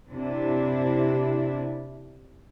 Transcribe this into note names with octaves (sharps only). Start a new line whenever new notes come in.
C3 D4 E4